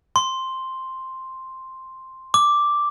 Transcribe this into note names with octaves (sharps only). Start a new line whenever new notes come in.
C6
D6